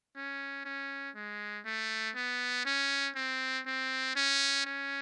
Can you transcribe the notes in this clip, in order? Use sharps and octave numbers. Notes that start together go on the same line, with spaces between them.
C#4
C#4
G#3
A3
B3
C#4
C4
C4
C#4
C#4